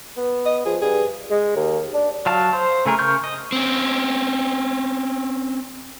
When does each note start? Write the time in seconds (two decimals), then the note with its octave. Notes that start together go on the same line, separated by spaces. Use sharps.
0.17 B3
0.46 D#5
0.66 F3 G#4
0.82 G2 G#4
1.31 G#3
1.56 D#2
1.94 D4
2.26 F#3 F5 A5
2.53 C5
2.85 C#3 A3 G#4 A#4
2.99 C#3 A#4 C#6 F6 G6
3.24 D#5
3.52 C4 C#4